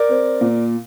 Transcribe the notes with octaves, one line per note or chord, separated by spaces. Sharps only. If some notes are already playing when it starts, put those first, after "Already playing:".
Already playing: A#4 D5
C4
A#2